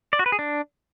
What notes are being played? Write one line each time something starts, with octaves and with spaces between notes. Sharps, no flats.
D5
F#4
B4
G#4
D4